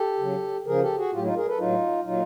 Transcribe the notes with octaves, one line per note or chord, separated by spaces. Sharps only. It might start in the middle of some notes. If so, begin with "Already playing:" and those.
Already playing: G4 A4
C#3 F#3
C#3 F3 G#4 A#4
G4 A4
F#4 G#4
A2 F#3 F4 G4
D#4 F4
G#4 A#4
A4 B4
A2 F#3 D#4 F4
A#2 F#3 D#4 F4